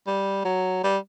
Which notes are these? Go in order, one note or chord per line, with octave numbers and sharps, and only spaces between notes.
G3
F#3
G3